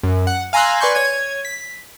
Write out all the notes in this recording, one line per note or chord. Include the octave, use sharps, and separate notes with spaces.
F#2
F#5
F5 G#5 A#5 C6 E6 F#6
B4 D5 G#5 C6 C#6 G6
C#5 G#6 D#7
B6